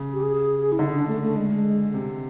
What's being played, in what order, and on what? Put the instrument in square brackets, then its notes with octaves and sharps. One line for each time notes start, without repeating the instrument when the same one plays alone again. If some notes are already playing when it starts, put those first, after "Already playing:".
Already playing: [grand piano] C#3
[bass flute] G4
G#4
E4
[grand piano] D3 [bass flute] D#4
[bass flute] D#4
D4
A3
A3
G#3
[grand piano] C3